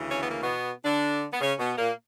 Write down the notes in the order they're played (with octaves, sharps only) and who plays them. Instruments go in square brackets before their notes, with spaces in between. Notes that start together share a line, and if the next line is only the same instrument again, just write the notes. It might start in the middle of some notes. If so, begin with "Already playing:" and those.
Already playing: [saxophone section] D2 C#3 E3
C#4
B3
A#3
B2 B3
D3 D4
B3
C#3 C#4
B2 B3
A#2 A#3